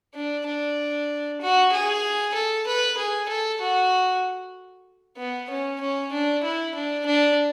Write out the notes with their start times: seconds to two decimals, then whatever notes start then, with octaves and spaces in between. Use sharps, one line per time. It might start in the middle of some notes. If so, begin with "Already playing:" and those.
0.14 D4
0.46 D4
1.41 F#4
1.72 G#4
2.35 A4
2.67 B4
2.97 G#4
3.29 A4
3.61 F#4
5.17 B3
5.50 C#4
5.81 C#4
6.12 D4
6.43 E4
6.75 D4
7.06 D4